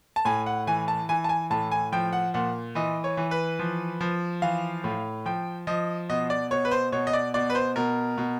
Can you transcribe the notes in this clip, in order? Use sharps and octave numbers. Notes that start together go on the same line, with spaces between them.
A5
A2 G#5
F#5
E3 G#5
A5
E3 G#5
A5
G#5
A2 A5
G#5
F3 G5
F#5
A#2 F#5
E3 D#5
C#5
E3
B4
F3
F3
E3 F5
A2
F3 G5
F3 D#5
B2 D#5
D5
B2 C#5
B4
C5
B2 C#5
D#5
D5
B2 D5
B4
C5
B2 A#4
B2